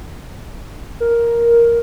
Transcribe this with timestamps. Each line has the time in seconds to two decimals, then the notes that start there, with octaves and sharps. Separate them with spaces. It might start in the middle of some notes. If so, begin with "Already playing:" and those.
1.00 A#4